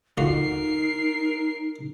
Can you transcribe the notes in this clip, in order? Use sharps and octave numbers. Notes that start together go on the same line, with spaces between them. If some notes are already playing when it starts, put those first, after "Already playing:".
D2 D#4 F4 F#4 A#4 C7